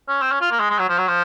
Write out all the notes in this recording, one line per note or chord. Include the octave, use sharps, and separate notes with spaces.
C#4
C4
C#4
F4
A#3
G#3
G#3
F#3
F3
F#3
F3